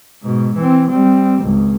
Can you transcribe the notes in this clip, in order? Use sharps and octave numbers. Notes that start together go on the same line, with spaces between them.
G#2 B2
E3 C4
G3 C4
G#1 C#2